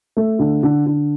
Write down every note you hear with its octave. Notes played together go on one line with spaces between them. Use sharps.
A3
D3
D3
D3